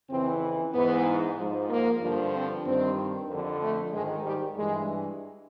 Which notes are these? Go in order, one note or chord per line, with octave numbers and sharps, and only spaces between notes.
F2 C#3 E3 C4
G#2 E3 B3
G#2 F3
A#3
G2 D3 F3
C4
G2 D#3 C4
F2 D3 F3
A3
G#2 D#3 G#3
G3
G2 E3 G#3